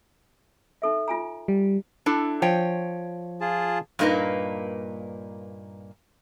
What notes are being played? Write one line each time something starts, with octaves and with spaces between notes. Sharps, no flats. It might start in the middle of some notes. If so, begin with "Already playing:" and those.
D#4 A4 E5
F4 G#5 A#5
G3
D4 E4 A4
F3 C#5 G5
F4 G#4 A5
G2 A#2 A#3 D#4 B4